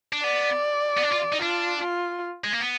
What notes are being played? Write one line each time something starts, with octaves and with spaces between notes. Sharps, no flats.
D4
B3 D5
B3
D4
F4
D#4
D4 F4
F4
G#3
A#3
B3